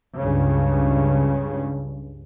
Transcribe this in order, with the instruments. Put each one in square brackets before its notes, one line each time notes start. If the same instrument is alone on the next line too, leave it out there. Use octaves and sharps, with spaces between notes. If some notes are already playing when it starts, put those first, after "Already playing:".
[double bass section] C#2 G2 C#3